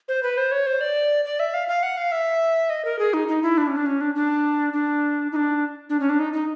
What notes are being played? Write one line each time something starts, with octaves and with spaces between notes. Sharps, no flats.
C5
B4
C5
C#5
C5
D5
D5
E5
F5
F5
F#5
F5
E5
D#5
A#4
G#4
D#4
D#4
E4
D4
C#4
D4
C#4
D4
D4
D4
D#4
D4
D4
C#4
D4
D#4
D#4